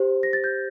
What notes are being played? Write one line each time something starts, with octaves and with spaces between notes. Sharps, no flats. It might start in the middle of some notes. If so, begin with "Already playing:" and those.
Already playing: G4 C5
A#6
A6
G6